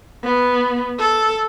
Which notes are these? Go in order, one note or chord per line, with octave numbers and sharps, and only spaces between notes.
B3
A4